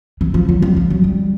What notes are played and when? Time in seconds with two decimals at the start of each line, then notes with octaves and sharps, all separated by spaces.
0.21 E3
0.34 F3
0.49 F#3
0.62 G3
0.77 F3
0.90 F#3
1.04 G3